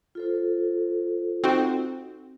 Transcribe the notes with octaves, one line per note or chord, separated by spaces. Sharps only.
F4 A4 C5
C4 D#4 F#4